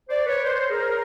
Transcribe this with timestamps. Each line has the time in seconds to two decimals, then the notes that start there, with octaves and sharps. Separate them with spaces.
0.09 C5 D5
0.26 B4 C#5
0.43 A#4 C5
0.69 G#4 A#4